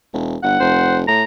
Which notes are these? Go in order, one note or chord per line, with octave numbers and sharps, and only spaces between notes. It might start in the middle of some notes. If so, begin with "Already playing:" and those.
E1
G1 F#5
F1 C5
A2 A#5